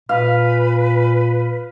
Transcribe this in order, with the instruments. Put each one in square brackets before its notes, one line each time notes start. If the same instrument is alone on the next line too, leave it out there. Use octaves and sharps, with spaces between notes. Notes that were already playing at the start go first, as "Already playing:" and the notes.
[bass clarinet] A#2 [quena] B4 [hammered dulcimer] F5